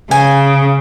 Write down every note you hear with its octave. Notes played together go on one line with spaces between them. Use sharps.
C#3 G#5